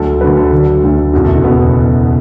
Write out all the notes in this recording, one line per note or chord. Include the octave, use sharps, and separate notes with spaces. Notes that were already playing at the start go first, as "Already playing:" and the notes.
Already playing: D2 D3 F#3 A4
D2 D3 F#3 B4
A4
D2 D3 F#3
D2 D3 F#3
F#1 E2 B2 F#4
A4
F#4
F#1 E2 B2 B3